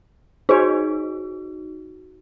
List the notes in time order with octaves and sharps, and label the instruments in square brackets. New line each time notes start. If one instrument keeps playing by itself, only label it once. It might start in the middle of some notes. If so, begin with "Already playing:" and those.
[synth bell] D#4 F#4 [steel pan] G#4 C5 C#5